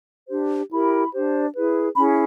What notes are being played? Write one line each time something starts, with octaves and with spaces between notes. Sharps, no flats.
D4 G4 C5
E4 G4 A#4 B5
D4 G4 C5
E4 G#4 B4
C#4 E4 G#4 B5